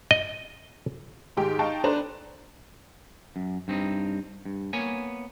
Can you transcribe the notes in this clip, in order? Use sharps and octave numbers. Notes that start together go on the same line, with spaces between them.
D#5
G#2 D#3 G4 G#4
D#4 F5 G5 A5 C#6
D4 A4 B4 C5 A5 A#5
F#2
G2 C4 C#4 D#4
G2
A#3 B3 C#5 G#5